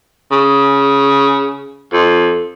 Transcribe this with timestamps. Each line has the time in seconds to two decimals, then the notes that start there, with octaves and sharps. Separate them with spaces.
0.32 C#3
1.93 F2